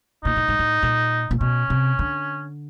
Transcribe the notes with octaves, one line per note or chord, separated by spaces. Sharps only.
A#2 D#4
A2
G#2
A2
A#2
A#2
B2 C#4
C3
D3